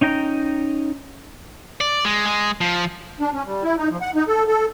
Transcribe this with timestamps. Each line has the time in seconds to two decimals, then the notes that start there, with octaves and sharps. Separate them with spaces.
0.01 C#4 D#4 G5 A#5
1.81 D5
2.05 G#3
2.26 G#3
2.61 F3
3.20 D4
3.33 C#4
3.45 G3
3.64 E4
3.78 D#4
3.90 F3
4.01 F#5
4.15 D#4
4.28 A4
4.47 A4